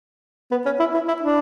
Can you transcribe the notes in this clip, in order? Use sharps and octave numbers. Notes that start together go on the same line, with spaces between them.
B3
C#4
E4
E4
E4
D4